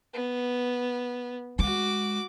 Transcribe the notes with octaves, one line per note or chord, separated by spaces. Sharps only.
B3
G#3 F#4 D6